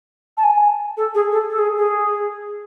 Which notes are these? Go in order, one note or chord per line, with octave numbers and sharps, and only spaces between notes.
A5
G#5
A4
G#4
A4
A4
G#4
G#4